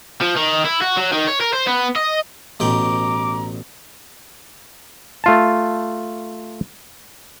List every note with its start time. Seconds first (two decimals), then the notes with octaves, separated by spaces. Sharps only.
0.21 F3
0.36 D#3
0.65 E4
0.81 F#4
0.97 F#3
1.12 D#3
1.27 C#5
1.40 A#4
1.53 C5
1.67 B3
1.96 D#5
2.60 A1 B2 G5 A#5 D6
5.24 A3 F4 A5